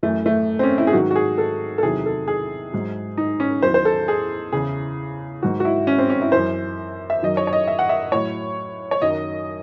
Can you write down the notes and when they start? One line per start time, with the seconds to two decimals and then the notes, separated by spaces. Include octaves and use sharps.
0.03 F#2 E3 A3
0.26 A3
0.59 C4
0.63 C#4
0.78 E4
0.87 G#4
0.93 G#2 D#3 F#3 F#4
1.11 F#4
1.16 G#4
1.38 A4
1.78 A4
1.83 E2 C3 D#3 F#3 G#4
2.06 A4
2.28 G#4
2.73 G#2 F#3
3.17 D#4
3.40 C#4
3.63 E2 D#3 F#3 C5
3.74 C5
3.85 A4
4.08 G#4
4.52 E2 C#3 E3 G#4
5.43 G#2 D#3 F#3 F#4
5.60 F#4
5.65 E4
5.87 C#4
5.98 C4
6.10 C#4
6.22 E4
6.32 F#2 E3 C5
7.10 E5
7.22 F#2 D#3 F#3 D#5
7.37 C#5
7.47 C#5
7.53 D#5
7.68 E5
7.79 F#5
7.89 E5
8.12 A2 F#3 C#5
8.91 C#5
9.02 F#2 D#3 F#3 D#5